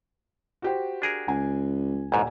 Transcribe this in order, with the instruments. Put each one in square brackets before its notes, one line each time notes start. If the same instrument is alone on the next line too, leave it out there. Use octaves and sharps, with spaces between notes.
[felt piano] F#4 G4 C5
[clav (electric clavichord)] D4 G#4 A#4
[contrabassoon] C#2 [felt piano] G#5
[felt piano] D#1 G#5 [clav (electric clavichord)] A1 G#2